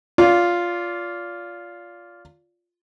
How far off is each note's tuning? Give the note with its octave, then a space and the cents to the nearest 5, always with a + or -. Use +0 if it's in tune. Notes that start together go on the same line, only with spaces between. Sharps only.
F4 +0 D5 -30